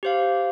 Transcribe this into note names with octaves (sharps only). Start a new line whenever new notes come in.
G4 C5 F5